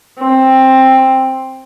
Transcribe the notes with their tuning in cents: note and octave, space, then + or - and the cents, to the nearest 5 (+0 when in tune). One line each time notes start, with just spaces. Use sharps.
C4 +10